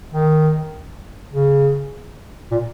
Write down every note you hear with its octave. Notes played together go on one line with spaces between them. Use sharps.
D#3
C#3
A#2